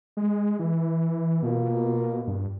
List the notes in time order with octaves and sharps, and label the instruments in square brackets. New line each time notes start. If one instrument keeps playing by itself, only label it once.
[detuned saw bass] G#3
E3
[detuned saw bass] B2 [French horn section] A#3 F4
[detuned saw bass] G2